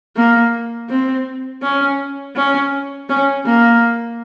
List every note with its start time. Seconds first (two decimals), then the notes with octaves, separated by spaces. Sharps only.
0.17 A#3
0.90 C4
1.63 C#4
2.36 C#4
3.09 C#4
3.46 A#3